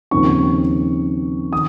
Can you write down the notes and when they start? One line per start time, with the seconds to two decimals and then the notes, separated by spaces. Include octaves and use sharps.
0.11 D#2 C#3 F3 C4 D#4 C#6
1.53 D#3 D#6